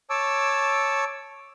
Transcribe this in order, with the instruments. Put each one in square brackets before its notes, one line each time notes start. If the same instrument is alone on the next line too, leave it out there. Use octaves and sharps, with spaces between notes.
[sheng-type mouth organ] C#5 A5 D6 E6